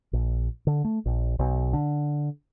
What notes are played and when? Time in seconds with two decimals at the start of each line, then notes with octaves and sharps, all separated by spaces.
0.13 A#1
0.67 D3
0.84 A3
1.06 A#1
1.39 B1
1.73 D3